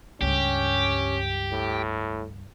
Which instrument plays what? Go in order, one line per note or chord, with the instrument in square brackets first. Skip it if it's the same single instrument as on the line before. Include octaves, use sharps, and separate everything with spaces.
[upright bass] C#2 G2 [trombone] C#4 [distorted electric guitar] G4
[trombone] A2